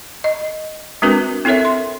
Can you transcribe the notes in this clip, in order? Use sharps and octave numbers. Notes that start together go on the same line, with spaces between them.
D#5
G#3 C4 D4 F#4 A#4 B4
C4 E4 A4 A#4 C#5 E5
C6